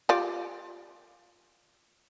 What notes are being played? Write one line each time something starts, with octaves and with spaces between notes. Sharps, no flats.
F4 G4 D5